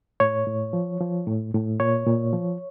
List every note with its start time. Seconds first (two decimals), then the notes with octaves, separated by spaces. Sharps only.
0.20 A2 C#5
0.47 A2
0.73 F3
1.01 F3
1.27 A2
1.54 A2
1.80 A#2 C#5
2.07 A#2
2.33 F3